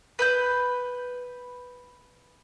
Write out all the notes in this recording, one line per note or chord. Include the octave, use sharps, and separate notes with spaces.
B4 B5 G6